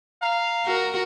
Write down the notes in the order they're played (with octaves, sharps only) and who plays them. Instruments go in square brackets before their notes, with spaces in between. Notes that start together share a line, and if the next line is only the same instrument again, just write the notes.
[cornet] F5 [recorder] A#5
[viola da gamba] F#4 A#4